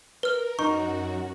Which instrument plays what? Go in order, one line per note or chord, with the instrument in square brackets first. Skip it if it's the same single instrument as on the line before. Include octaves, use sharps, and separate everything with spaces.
[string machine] A#4 [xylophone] B4 F6
[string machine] F#2 F#4 [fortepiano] D#4 [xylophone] C#6